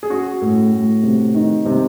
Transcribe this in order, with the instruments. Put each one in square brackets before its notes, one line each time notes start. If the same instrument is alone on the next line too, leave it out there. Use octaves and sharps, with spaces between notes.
[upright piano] G#4
C#4 F#4
A2
A2
C3
D#3
C3